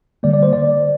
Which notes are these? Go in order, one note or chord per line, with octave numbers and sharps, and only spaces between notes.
D3 G3 A#3 D5
D5
C5
D5